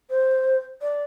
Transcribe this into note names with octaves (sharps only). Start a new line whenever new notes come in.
C5
D5